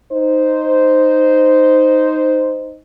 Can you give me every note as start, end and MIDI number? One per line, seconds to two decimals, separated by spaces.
0.11 2.77 63
0.11 2.77 72